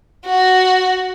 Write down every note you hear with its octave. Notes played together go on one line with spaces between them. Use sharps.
F#4